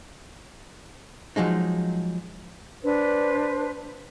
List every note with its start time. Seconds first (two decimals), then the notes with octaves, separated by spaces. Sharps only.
1.36 F3 F#3 G#3 D#4
2.84 D4 B4 C5